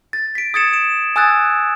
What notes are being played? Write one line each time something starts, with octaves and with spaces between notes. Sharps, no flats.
A6
B6 D7
D#6 G#6 A6 C#7 E7
D7 E7
G#5 D#6 E6 F#6 G#6 A6